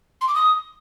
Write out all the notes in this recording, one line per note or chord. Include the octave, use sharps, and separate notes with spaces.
C6
D6
D#6